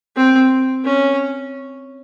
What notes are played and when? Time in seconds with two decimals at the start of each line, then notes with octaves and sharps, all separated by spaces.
0.16 C4
0.85 C#4